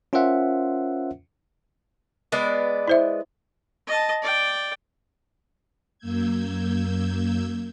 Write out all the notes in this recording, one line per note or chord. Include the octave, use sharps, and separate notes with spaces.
C#4 F4 A#4 C5 E5 F#5
G#3 B3 D5
E4 C5 E5
D#5 A5
D5 G5
F#2 A#3 E6 G6 G#6